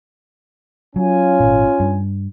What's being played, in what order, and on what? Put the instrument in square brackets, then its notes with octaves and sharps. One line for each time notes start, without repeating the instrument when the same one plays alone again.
[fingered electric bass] F#3 [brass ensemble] C#4 F4 G#5
[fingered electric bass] G#1 A#2
G2 G3